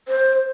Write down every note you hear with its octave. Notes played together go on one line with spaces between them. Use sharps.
C5